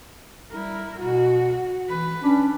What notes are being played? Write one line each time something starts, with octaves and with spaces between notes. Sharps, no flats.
G3 E4 A#4
B2 F#4
E3 B4
C#4 D4